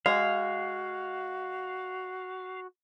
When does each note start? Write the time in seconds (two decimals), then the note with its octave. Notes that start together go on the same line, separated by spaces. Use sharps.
0.06 G#3 F#4 F5